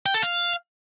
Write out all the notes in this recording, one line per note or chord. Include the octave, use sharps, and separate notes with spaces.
G5
A4
F5